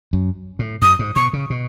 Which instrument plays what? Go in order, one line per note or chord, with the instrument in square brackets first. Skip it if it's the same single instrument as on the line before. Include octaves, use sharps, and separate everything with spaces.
[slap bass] F#2
A2
[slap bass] F#2 [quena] D#6
[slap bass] G#2
[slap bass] B2 [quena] C#6
[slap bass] C#3
B2